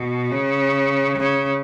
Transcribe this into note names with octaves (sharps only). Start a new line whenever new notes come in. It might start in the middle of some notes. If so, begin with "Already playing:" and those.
Already playing: B2
C#3
C#3